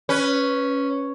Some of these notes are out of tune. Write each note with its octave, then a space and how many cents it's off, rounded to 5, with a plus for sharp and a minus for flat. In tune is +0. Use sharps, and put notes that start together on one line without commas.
C#4 +0 B4 +0